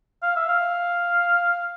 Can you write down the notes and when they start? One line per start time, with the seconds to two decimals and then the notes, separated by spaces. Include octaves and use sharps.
0.23 F5
0.36 E5
0.49 F5